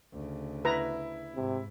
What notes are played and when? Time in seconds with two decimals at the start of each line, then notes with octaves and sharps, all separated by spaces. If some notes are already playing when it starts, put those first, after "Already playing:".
0.13 D2 C#3
0.65 E4 B4 A#5
1.35 G#2 C3